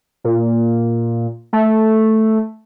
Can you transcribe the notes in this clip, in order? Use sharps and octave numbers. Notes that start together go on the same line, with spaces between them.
A#2
A3